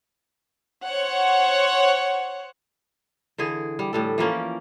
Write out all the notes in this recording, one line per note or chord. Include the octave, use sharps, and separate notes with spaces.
C5 C#5 F#5
D3 E3 G#4
G3
A2 G3 A4
E3 F3 A#3 C#4